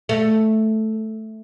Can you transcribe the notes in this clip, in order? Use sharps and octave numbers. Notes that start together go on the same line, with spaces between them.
A3